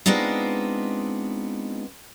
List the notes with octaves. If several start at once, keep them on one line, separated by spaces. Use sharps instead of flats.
G#3 B3 C4 D4 D#4 F4